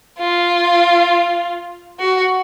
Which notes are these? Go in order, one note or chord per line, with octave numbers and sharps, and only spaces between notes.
F4
F#4